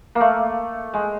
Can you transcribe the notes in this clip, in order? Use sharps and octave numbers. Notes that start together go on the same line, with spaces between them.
A#3
A3
G#3